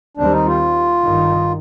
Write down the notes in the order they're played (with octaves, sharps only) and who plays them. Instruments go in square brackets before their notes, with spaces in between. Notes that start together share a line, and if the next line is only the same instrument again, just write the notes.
[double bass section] D#2 D#3 G3 C4 [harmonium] D4
[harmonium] D#4
F4
[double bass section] G#1 G2 D#3